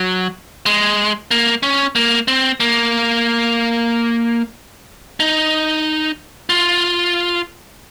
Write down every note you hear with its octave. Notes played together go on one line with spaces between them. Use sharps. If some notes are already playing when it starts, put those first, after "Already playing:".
Already playing: F#3
G#3
A#3
C#4
A#3
C4
A#3
D#4
F4